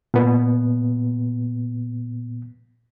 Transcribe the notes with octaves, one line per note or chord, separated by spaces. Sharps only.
A#2 B3